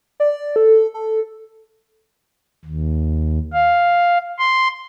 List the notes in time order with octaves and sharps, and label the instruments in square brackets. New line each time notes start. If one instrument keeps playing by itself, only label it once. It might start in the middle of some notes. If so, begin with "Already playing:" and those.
[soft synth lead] D5
A4
A4
[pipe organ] D#2
F5
C6